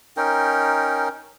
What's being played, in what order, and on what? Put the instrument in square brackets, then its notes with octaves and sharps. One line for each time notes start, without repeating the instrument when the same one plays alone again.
[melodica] C#4 D#4 A#4 G5